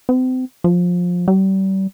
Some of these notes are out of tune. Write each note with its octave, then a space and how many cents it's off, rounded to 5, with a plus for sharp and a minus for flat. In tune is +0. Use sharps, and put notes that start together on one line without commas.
C4 -35
F3 +20
G3 -35